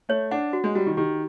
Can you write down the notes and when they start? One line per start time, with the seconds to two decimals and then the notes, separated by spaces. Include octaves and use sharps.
0.09 A3 C#5
0.31 D4 F#5
0.53 F#4
0.64 G#3
0.75 G3 F#4
0.86 D#3
0.97 D#3 G4